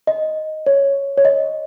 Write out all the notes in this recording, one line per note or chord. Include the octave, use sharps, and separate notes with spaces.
D#5
C#5
C#5
D#5